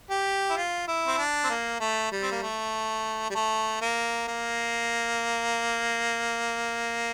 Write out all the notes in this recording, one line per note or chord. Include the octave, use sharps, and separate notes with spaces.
G4
E4
F4
E4
C4
D4
C4
A#3
A3
G3
C4
A#3
A3
G3
A3
A#3
A#3